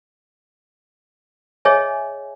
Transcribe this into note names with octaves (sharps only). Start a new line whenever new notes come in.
G#4 C#5 D#5 E5 G#5